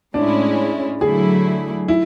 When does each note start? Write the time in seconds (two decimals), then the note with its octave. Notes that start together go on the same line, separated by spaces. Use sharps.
0.14 A2 G#3 C#4 D4 E4
1.01 D3 F#3 A3 E4 G#4
1.88 E4